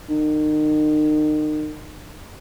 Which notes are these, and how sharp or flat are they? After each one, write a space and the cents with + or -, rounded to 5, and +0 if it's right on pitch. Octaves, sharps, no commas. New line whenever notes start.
D#3 -35